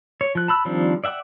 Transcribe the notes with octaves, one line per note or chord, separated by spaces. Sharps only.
C#5
F3 F#6
A5 B5 E6 F#6
D#3 F3 G3 C4 D4
D5 E5 F#5 G5 D6